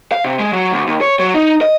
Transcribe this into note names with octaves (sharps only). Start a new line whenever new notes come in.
F5
C3
G#3
F#3
D2
D#2
C#5
F#3
D#4
D#5